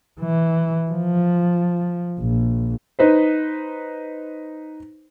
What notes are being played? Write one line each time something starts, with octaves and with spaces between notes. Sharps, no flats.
E3
F3
A#1
D#4 B4 C5